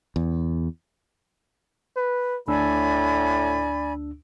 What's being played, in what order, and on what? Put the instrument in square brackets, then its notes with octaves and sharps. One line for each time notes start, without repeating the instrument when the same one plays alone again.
[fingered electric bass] E2
[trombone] B4
[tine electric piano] D2 D4 E6 [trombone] A2 [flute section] D5 G#5 B5